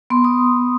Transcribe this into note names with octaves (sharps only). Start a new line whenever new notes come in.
B3 C6
D#6